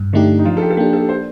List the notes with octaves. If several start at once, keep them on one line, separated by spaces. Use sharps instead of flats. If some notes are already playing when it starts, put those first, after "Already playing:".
Already playing: G2
D3 A3 D4 D#4 G4
D#4
F3 F4
A4
G4
A4
A#3 D4 G4
A4
C5